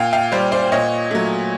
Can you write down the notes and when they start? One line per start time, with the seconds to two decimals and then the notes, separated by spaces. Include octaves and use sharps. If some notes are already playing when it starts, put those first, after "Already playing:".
Already playing: A#2 F5 G5
0.13 F5 G5
0.32 G3 C5 D5
0.52 C5 D5
0.72 A#2 C#5 D#5
1.11 F#3 A3